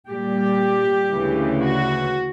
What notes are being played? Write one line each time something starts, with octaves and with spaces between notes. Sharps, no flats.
A#2 G3 G4
D2 C#3 E3
F#4